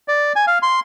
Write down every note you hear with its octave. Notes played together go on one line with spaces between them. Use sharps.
D5
G#5
F5
C6